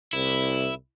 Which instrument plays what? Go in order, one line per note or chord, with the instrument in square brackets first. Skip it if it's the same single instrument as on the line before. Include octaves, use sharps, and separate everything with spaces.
[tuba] C2 [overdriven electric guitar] E4